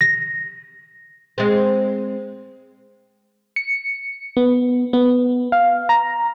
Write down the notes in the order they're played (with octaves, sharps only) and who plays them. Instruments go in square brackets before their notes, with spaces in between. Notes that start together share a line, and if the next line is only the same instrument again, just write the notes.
[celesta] A#6
[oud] G#3 C4
[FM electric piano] C#7
B3
B3
F5
A#5